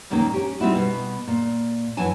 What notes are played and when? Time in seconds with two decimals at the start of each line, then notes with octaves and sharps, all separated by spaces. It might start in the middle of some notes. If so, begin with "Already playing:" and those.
0.10 F2 A#2 D#3 A#3 C#4 A#4
0.34 C#4 G4
0.60 G3 C4 D#4 E4 F#4
0.75 B2 B3
1.28 A#2
1.97 F#2 E3 F#3 G#5 A5